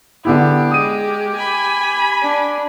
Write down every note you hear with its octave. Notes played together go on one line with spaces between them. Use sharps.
D3 B3 E4 G4
G#3 D#6 D#7
G#5 B5
D4